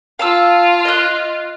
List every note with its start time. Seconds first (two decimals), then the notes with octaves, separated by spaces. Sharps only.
0.19 F4 F5 A5 E6
0.85 D#5 F#6